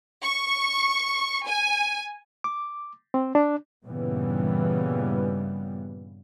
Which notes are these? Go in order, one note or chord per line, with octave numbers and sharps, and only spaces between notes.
C#6
G#5
D6
C4
D4
G2 A#2 C#3 E3 G3 B3